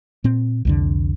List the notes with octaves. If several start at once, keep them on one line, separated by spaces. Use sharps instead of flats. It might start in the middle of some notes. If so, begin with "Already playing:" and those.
A#2 C4
C2 F2 D3